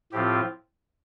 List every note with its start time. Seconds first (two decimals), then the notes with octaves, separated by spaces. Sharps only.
0.12 A2 F3 C4 F4 G4